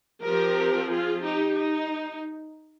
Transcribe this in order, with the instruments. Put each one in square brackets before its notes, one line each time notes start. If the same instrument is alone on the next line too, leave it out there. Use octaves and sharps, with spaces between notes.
[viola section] F3 C4 G4 A#4
F4 G#4
D#4 G4
D#4